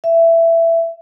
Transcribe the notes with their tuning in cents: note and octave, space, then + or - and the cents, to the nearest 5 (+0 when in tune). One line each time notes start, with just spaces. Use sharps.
E5 +15